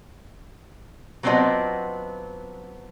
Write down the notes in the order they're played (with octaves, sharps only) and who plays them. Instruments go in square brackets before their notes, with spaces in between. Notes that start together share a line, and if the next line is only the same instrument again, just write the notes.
[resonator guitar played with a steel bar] F#3 B3 C4 D4 F4 D#5